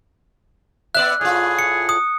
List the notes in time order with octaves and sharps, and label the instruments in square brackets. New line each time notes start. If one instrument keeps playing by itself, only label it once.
[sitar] B3 D5 E5 [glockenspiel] F#6
[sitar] A2 F4 [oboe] G#4
[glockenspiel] C#7
D#6